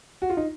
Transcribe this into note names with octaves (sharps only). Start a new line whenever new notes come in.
F#4
F4
D#4